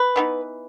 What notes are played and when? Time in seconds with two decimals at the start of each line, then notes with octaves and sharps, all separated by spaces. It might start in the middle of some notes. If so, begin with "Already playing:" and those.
Already playing: B4
0.16 E3 B3 D#4